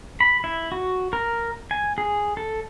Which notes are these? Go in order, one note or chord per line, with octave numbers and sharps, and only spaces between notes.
B5
E4
F#4
A#4
G#5
G#4
A4